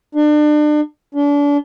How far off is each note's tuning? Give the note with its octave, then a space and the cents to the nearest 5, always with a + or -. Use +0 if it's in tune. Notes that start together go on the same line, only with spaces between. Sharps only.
D4 +35
D4 -35